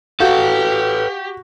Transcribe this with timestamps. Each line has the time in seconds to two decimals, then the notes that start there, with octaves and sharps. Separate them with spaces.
0.20 F#4 G4 A4 B4 F5 G6